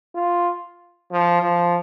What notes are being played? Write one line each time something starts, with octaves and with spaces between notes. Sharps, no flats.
F4
F3
F3